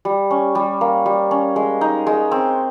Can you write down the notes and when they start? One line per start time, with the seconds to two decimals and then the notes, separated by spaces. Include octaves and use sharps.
0.05 G3
0.31 C#4
0.55 G3
0.81 A#3
1.06 G3
1.31 C#4
1.56 G#3
1.81 D#4
2.07 G#3
2.31 C4